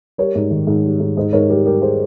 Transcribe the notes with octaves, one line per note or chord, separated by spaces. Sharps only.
G3 A#4 C#5
G#2
D#3
G#2
G3
G#2
G#2 C5 D#5
G#2 A#4 C#5
G3 G4 A#4
G3 G4 A#4
G#4 C5